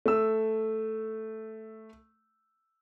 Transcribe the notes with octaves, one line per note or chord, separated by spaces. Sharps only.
A3 E6